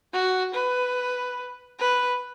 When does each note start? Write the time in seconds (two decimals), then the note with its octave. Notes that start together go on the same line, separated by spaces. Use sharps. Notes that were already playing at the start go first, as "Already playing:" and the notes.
0.13 F#4
0.54 B4
1.80 B4